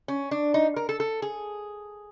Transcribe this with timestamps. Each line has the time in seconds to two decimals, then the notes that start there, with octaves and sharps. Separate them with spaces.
0.08 C#4
0.31 D4
0.54 D#4
0.76 A#4
0.89 A4
1.00 A4
1.22 G#4